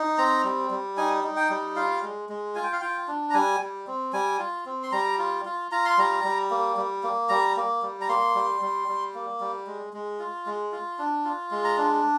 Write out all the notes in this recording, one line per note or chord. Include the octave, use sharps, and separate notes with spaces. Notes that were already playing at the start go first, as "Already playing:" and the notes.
Already playing: D#4
C4 A#5
G3
G3
D#4 G#5
D#4
G5
G3
F4 F5
G#3
G#3
F4 G#5
G5
F5
F4 G5
D4
A#5
G3 G#5
G3
C4
G3 G#5
F4
C4
C6
G3 A#5
F4
F4
F4 A#5
C6
G3 A#5
G3
A#3
G3
A#3
G3 A#5
A#3
G3
A#5
A#3 C6
G3
G3
G3
A#3
G3
G#3
G#3
F4
G#3
F4
D4
F4
G#3
A#5
D4